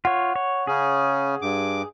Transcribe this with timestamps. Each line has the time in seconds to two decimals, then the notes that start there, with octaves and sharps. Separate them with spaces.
0.05 F4 C#5 F#5
0.36 C#5
0.67 C#3 C#4 G#4
1.42 G2 D6